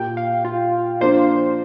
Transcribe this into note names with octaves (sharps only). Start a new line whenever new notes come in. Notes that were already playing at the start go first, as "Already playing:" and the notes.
Already playing: A#2 A#3 G4 G5
F5
F4
F3 A#3 D4 F4 C5